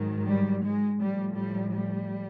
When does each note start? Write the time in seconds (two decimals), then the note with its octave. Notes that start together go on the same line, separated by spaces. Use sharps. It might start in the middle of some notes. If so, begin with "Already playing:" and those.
Already playing: G#2 D#3 F#3
0.28 G3
0.65 G#3
1.01 A2 F3 G3
1.38 G3
1.75 G3